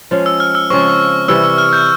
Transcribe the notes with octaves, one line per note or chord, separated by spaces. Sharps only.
F3 G#3 C#4
E6
F6
E6
C#3 F3 G#3 C4 C#6
C3 E3 G3 E6
E6
F6
G6